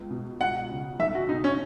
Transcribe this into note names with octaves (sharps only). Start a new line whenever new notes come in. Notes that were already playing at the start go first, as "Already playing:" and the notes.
Already playing: C#2 B3
B2
C#2 F#5
C#3
B1 E5
F#4
B2 D#4
C#4